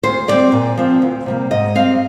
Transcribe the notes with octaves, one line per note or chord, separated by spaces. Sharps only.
D2 C5
D3 G3 C4 D5
A#2
F3 C4
D2
C3 G3 A#3
G#2 D#5
G3 C4 F5